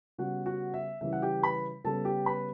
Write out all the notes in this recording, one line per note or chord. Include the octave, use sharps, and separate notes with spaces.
C#3 G3 B3 F#4 F#5
F#4 F#5
E5
C#3 E3 G3 E5
F#5
G4 G5
B4 B5
C#3 G3 B3 A4 A5
G4 G5
B4 B5